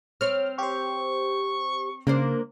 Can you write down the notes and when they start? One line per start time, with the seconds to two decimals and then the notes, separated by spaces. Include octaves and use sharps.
0.21 C4 C#5 F6
0.58 G4 C5 C#6
2.07 C#3 A#3 D4 C5